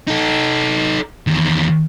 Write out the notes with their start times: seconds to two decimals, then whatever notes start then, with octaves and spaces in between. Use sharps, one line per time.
0.08 D#4 A4
1.27 E2 D#3